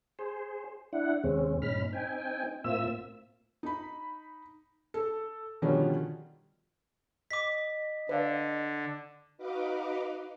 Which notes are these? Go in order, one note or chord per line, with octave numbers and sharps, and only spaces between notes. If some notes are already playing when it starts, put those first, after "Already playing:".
G#4 C5
D4 E4 F#5
D#2 C3 G#3 C4 C#4
G2 A#2 C#4 D#4 B5 F6
C4 D#4 G5 G#5
A2 A#3 C4 F4 E5 E6
D#4 B5
A4
B2 D3 D#3 F3 G3 C#4
D#5 D6 B6
D3 B4 D5 F5
D#4 F#4 B4 D#5 F5 D6